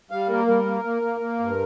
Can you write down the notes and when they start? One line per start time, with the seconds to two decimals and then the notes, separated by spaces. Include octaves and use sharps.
0.11 G3 F5
0.29 A#3 A#4
0.47 G3 A#4
0.66 A#3
0.84 A#3
1.02 A#3
1.20 A#3
1.39 G2